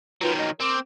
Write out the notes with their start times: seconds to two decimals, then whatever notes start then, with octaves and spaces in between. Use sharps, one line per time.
0.21 D#3 F#3 F4 B4
0.38 D#5
0.60 C4 A#4 D6